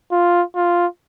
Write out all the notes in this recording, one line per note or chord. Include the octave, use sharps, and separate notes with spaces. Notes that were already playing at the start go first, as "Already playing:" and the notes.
F4
F4